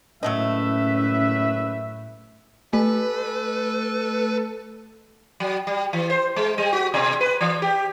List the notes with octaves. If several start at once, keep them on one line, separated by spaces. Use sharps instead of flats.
F#1 A2 F#3 A3 C#4 B4 D#5 E5
A3 A4 B4
F#3
G3
E3
C5
G#3
G3
F#4
B2
B4
E3
G4